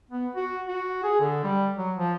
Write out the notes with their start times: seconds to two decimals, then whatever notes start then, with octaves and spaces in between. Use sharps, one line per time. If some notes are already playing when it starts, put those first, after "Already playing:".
0.11 B3
0.35 F#4
0.68 F#4
1.03 G#4
1.20 D3
1.43 G3
1.77 F#3
1.96 F3